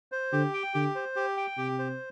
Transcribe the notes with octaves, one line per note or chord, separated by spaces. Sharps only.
C5
D3 G4
G5
D3 G4
C5
G4
G5
C3 G4
C5